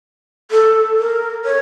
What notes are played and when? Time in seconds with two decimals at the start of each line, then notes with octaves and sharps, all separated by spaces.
0.51 A4
0.98 A#4
1.45 C#5